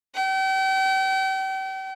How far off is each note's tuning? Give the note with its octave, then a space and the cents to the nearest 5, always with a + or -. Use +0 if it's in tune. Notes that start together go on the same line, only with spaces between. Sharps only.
G5 -40